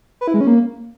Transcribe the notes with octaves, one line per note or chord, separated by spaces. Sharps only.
B4
E4
G#3
C#4
A#3